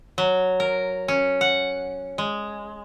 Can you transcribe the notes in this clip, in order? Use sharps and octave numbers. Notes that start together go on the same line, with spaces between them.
F#3
A#4
C#4
F#5
G#3